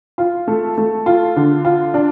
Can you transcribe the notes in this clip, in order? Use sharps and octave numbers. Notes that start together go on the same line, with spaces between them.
F4
A3
A3
F4
D3
F4
D4